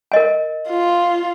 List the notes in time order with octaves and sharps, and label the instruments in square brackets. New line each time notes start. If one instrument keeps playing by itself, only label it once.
[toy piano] A#4 D#5 G#5
[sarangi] F4